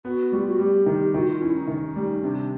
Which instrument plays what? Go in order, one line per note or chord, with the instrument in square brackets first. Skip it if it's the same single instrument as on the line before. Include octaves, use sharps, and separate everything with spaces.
[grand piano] B3 [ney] F#4
[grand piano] G3 [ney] F4
[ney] F#4
[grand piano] G3 [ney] G4
[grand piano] D#3
[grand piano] D#3 [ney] F#4
[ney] F4
[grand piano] C#4 [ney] E4
[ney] D#4
[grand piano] D#3 [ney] D#4
[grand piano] G3
[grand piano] C3 [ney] D4